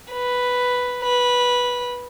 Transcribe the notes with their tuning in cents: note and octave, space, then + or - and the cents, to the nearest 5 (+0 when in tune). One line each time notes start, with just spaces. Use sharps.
B4 +0
B4 -10